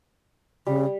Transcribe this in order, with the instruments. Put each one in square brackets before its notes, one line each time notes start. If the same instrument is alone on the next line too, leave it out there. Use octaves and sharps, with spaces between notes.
[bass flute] C#3 [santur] G3